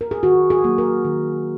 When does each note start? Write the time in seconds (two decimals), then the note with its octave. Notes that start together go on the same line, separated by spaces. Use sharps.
0.01 A#4
0.11 G#4
0.23 D#3 F#4
0.50 G#4
0.64 F#3 A#3
0.78 A#4
1.05 D#3